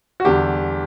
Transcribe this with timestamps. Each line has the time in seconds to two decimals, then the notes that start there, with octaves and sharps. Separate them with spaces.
0.20 F#4
0.25 E2 D3 G3 G4